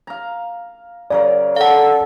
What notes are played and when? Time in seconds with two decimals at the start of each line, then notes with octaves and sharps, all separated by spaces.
0.07 F5 A#5
1.10 C#3 F#3 A#4 D5
1.56 A4 F5 F#5